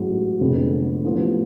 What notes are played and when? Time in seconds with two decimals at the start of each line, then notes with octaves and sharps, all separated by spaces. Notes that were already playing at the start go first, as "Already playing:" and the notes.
Already playing: A1 G#2 F#3
0.40 F1 F2 D3 G#3 B3
1.05 A1 A2 F3 B3